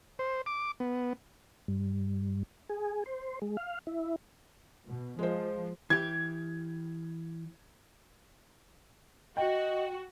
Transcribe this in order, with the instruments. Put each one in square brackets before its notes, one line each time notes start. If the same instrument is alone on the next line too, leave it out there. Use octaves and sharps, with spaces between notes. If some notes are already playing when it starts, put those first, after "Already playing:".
[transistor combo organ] C5
D6
B3
[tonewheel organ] G2
G#4
C5
G#3
F5
E4
[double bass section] B2
[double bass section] F3 [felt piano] G#3 C5
[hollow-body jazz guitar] E3 G4 [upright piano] G#6
[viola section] F#4 [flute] D#5 [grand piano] G5